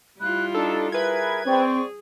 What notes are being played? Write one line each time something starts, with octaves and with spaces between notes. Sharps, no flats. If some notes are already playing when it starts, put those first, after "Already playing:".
G3 E4 F4 B5 F#6
D4 D#4 A4
G#4 A#4 B4 E5 G#6
C4 G#4 D5 G5 C#6